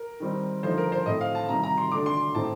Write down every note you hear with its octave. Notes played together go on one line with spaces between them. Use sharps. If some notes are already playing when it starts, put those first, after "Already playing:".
Already playing: A#4
D#3 G3 C4 D#4
D3 F3 A3 D#4 C5
A#4
C5
A2 A3 C4 D#5
F5
A5
C3 D#3 G3 A#5
A#5
C6
D3 A3 D4 D6
C6
A2 A3 C4 D#4 A5